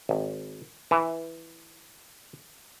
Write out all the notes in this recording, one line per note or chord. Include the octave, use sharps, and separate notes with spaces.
G#1
E3